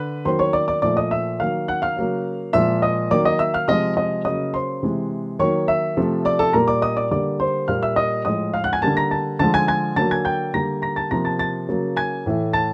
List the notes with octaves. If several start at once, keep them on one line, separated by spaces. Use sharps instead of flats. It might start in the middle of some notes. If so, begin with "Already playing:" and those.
Already playing: D3 B4 B5
D#3 F#3 A#3 C5 C6
C#5 C#6
D5 D6
D5 D6
A#2 F3 A3 D5 D6
D#5 D#6
E5 E6
D#3 F#3 A#3 F5 F6
F#5 F#6
F5 F6
C#3 F#3 A#3
A#2 F3 G#3 E5 E6
D#5 D#6
D#3 F#3 A#3 D5 D6
D#5 D#6
E5 E6
F5 F6
C3 F3 G#3 D#5 D#6
D#5 D#6
C#3 F#3 A#3 D#5 D#6
C5 C6
C3 E3 G#3
D#3 F#3 A#3 C#5 C#6
E5 E6
C3 F3 A3
D5 D6
A4 A5
A#2 G3 A#3 A#4 A#5
D5 D6
D#5 D#6
D5 D6
D3 G3 A#3 D5 D6
C5 C6
A#2 G3 A#3 F5 F6
E5 E6
D#5 D#6
A2 F3 G#3 D#5 D#6
F5 F6
F#5 F#6
G#5 G#6
D3 G3 A#3 A5 A6
A#5 A#6
A5 A6
D3 F3 G#3 A5 A6
G#5 G#6
G#5 G#6
D3 F#3 A#3 A5 A6
G#5 G#6
G5 G6
D3 G3 A#3 A#5 A#6
A#5 A#6
A5 A6
C3 F3 A#3 A#5 A#6
A5 A6
A5 A6
C#3 F#3 A#3
G#5 G#6
A2 E3 A3
A5 A6